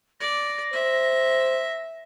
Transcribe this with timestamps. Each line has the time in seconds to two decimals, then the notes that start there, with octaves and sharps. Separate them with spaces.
0.20 D5 A#6
0.73 C5 E5